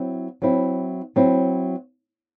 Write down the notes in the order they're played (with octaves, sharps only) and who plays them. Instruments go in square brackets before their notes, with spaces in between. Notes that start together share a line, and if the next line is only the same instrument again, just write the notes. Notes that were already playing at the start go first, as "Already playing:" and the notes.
Already playing: [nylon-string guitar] F#3 C4 E4
F#3 C4 E4
F#3 C4 E4